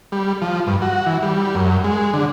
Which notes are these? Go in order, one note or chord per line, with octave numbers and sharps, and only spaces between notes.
G3
F3
G2
F#4
E3
G3
F#2
G#3
D3